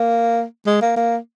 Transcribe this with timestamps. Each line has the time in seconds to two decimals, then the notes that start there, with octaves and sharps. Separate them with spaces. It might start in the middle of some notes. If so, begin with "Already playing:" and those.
Already playing: A#3
0.66 G#3
0.82 A#3
0.96 A#3